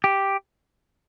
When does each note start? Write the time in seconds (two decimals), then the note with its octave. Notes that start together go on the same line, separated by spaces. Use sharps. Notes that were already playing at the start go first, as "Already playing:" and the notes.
0.04 G4